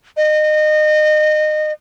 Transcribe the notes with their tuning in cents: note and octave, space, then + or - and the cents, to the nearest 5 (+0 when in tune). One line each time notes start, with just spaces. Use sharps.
D#5 -25